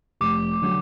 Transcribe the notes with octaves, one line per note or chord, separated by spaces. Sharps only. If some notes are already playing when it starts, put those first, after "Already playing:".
F1 D6
D3 F#3